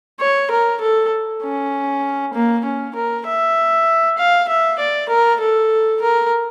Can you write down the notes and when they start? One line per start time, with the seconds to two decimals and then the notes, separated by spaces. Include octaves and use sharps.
0.20 C#5
0.51 A#4
0.81 A4
1.43 C#4
2.34 A#3
2.65 C#4
2.95 A#4
3.26 E5
4.18 F5
4.48 E5
4.79 D5
5.09 A#4
5.41 A4
6.02 A#4